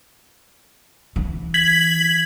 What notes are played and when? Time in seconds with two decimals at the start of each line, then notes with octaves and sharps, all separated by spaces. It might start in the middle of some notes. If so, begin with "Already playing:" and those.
1.16 E3
1.54 G#6 B6 F#7